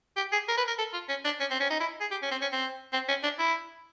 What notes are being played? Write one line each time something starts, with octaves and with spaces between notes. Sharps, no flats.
G4
G#4
A#4
B4
A#4
A4
F4
C#4
D4
C#4
C4
C#4
D#4
E4
G#4
G4
C#4
C4
C#4
C4
C4
C#4
D4
E4